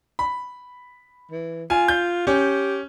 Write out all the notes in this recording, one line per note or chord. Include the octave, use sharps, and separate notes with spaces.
B5
E3
F4 G#5
G6
C#4 G4